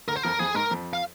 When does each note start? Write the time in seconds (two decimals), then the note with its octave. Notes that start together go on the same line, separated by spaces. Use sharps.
0.08 D2 D3 A#4
0.16 C5
0.23 F2 F3 A#4
0.39 F2 F3 G#4
0.54 G#2 G#3 A#4
0.70 F2 F3
0.93 F5